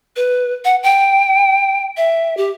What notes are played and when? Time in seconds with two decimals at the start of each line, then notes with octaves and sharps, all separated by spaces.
0.16 B4
0.65 F#5
0.83 G5
1.97 E5
2.37 G4